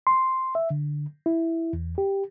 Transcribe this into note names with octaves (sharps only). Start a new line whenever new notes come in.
C6
E5
D3
E4
E2
G4